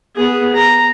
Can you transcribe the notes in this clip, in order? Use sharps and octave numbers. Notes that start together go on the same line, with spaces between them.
B3 G#4
A#5